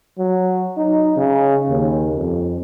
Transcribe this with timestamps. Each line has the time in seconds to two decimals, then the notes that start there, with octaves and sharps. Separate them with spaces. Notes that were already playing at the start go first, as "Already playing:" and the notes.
0.18 F#3
0.77 D#4
1.17 C#3
1.69 D#2
2.16 F2